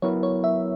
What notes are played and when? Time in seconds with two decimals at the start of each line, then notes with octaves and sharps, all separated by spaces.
0.02 F#3 B3 E4 A#4 C#5
0.23 C#5
0.44 E5